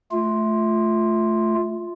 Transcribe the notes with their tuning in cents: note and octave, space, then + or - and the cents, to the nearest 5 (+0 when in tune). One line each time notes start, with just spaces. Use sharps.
A3 -10 F4 +0